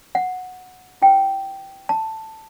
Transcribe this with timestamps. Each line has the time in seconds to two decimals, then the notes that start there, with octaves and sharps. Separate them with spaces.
0.15 F#5
1.02 E4 B4 G5
1.89 A5